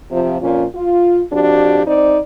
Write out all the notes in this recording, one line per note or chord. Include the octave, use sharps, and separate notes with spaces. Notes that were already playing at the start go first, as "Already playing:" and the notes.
C3 F3
F2 A#2 C#4 F4
F4
F2 D4 F#4 G4
C4 D#4 D5